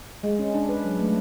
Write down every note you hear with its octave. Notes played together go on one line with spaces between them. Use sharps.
G#3
C#4
D4
B4
F#3
A3